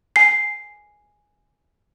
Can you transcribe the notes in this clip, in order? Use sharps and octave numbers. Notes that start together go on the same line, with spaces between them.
G#5 C7